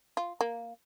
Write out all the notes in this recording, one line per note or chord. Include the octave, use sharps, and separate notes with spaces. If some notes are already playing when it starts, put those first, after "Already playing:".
F4
A#3